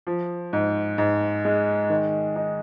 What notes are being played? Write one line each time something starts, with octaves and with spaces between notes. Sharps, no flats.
F3
G#2
G#2
G#3
D#3
D#4